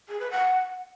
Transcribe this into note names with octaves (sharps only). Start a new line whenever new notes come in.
G#4
B4
F#5